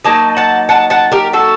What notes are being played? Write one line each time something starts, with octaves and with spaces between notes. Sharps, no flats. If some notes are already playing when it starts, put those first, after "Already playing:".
F#3 A#3 D#4 A5
F#5 A5
F#5 A5
F#5 A5
G4 A#4
F#4 A4